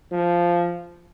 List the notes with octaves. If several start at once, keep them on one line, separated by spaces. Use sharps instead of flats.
F3